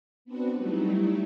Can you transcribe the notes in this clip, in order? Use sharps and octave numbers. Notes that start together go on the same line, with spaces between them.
B3 C4 D4 F#4 B4
F#3 G3 A3 D#4 E4